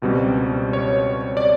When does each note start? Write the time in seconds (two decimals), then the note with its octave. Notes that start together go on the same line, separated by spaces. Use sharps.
0.02 C#2 B2 G3 C4
0.73 C#5
1.37 D5